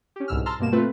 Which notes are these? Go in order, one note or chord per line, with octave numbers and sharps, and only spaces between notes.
C#4 G4
C2 G#2 B2 E6 F6
A5 A#5 C6 E6 F6
G2 B2 A#3 E7
A3 C4 F4 B4